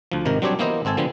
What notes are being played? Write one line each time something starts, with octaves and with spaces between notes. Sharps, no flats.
D2 F3
G#1 C3 D#3 A#4
F#3 G3 C4 D4 G4 C#5
E3 A#3 B3 E4 C5 D#5
G#1 C4 A4 G#5
D3 F3 B3 C4